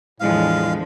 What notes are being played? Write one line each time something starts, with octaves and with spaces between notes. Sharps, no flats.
E2 A2 D3 F3 G#3 F5